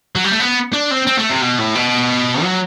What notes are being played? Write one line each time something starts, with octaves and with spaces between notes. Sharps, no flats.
F#3
G3
A3
B3
D4
C4
C4
A3
C3
B2
A2
B2
F#3